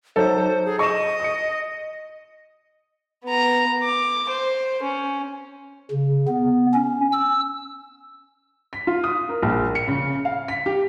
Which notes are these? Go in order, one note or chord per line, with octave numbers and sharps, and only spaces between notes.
F#3 D#4 A4 C5
G#4
D#5 C#6 E7
D#6 C#7
B3 A#5
D6
C5
C#4
C#3
B3
C#4
E6
B6
F4
D#6
A#4
A#1
C#7
C#3
F5
B6
G4